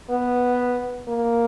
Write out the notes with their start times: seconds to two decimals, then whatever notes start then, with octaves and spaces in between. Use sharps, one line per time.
0.10 B3
1.09 A#3